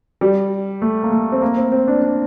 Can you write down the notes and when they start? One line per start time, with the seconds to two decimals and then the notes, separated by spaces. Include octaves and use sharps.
0.21 G3
0.82 A3
1.03 A#3
1.12 A3
1.32 C4
1.42 A#3
1.57 C4
1.72 C4
1.87 D4
2.02 D4